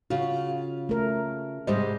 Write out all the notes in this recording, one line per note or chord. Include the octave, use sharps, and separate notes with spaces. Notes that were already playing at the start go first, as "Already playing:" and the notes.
C#3 F4 F#4
A3 A#4
G#2 C3 G3 G#3 C5 D#5